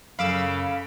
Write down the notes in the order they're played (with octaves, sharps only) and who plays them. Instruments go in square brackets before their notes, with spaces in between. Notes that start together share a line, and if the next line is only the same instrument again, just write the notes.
[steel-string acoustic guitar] F#2 A3 [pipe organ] C#3 [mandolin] F5 [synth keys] B5 D6 E6